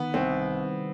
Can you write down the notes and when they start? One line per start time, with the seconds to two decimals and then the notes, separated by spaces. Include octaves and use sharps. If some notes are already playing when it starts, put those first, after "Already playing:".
Already playing: D#3 B3
0.14 C2 C4